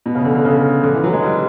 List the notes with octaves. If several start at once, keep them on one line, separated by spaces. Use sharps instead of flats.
B2
C#3
D3
D3
C#3
D3
E3
F#3
G#3
G3